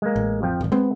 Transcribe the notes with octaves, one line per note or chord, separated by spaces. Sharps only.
G#3 A#3
A1
F2 F3 G5
D#1 G#1
G#3 B3 C4